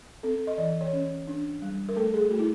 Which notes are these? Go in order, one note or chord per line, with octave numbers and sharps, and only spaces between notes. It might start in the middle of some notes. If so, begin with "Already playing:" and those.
C4 A4
D#5
E3 D5
C#5
C#4
D4
G3
A#4
A3 A4
G#4
A3 F#4
E4